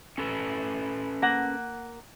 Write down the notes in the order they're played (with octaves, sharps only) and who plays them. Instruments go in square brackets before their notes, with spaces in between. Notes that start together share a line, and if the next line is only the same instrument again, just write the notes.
[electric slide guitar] C#4 A4 B4
[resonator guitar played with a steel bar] A#3 F#5